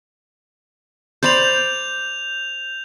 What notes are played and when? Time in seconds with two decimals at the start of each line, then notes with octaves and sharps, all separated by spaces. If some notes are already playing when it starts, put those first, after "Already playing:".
1.23 C5 D5 B5 G6 F7